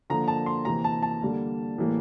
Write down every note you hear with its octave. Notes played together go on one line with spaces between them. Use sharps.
D3 F3 A#3 A#5
A5
C6
C3 E3 A#3 A#5
A5
A5
D3 G3 A#3
A2 E3 G3 A#3